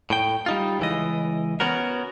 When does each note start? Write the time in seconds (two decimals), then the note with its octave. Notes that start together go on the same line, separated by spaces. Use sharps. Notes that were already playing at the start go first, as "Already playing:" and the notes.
0.10 A2 G5
0.46 G3 D#4 F4
0.79 C#2 E3 D#5
1.60 B3 C#4 F#4 A#4